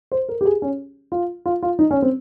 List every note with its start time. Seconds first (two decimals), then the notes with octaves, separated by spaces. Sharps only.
0.12 C5
0.29 A#4
0.41 G4
0.45 G#4
0.62 C#4
1.12 F4
1.46 F4
1.63 F4
1.79 D#4
1.91 C#4
2.02 C4